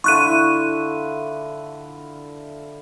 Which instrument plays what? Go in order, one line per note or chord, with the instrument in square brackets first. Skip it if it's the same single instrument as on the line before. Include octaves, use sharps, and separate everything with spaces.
[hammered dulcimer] D3 E4 F4 [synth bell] C#6 F#6 D#7